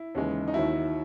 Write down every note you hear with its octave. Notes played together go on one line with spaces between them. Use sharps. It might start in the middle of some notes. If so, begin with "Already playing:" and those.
Already playing: E4
D#2 C#3 E3 G#3
D#4
D#2 D#3 F#3 E4